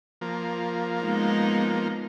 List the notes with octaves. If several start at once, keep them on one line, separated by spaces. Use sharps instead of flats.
F3 A#3
G#3 B3 D#4